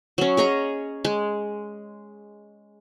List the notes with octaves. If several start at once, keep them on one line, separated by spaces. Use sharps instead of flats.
F#3 C#4
G#4 C#5 D#5 A#5
G#3